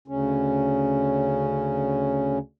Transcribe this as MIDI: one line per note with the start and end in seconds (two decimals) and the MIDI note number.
0.08 2.38 38
0.08 2.38 49
0.08 2.38 61